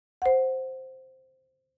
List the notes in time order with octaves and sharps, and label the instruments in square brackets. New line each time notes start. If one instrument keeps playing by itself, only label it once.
[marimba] C5 F#5